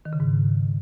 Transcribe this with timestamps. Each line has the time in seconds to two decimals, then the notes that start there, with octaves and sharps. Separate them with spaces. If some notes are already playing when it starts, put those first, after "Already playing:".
0.05 D#3
0.13 C#3
0.20 G#2